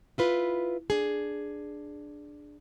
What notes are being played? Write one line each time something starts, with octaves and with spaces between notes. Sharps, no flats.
E4 F4 B4
D4 G#4